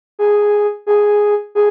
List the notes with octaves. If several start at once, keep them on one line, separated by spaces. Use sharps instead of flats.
G#4
G#4
G#4